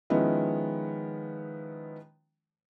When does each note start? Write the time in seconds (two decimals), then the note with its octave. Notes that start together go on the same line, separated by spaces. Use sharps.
0.10 D#3 F3 G#3 B3 C#4 E4